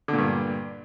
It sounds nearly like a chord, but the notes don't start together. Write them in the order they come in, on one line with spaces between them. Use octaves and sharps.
D3 A#2 G2